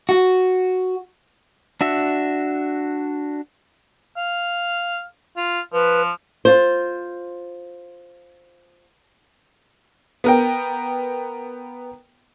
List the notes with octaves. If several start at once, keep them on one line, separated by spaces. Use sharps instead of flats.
F#4
D4 F#4 E5
F5
F4
F3 B4
F4 C5
B3 A#4 G5